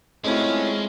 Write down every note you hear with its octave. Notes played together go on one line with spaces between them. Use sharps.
G#3 A3 C4 C#4 E4 F4